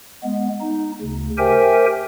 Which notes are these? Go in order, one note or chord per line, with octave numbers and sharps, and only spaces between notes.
G#3 B3
D#4
D2 C#3
G4 A#4 C5 E5 G5 G#5